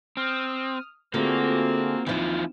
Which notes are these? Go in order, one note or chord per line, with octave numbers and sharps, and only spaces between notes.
C4 D#6 F6
D3 A3 A#3 C4 F4 F#4 G#4 A4
D#2 E3 F3 E4 F4